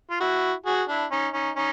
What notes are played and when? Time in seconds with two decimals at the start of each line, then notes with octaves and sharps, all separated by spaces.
0.10 F4
0.20 E4 F#4
0.66 F#4 G#4
0.89 D4 E4
1.11 C#4 D#4
1.33 C#4 D#4
1.56 C#4 D#4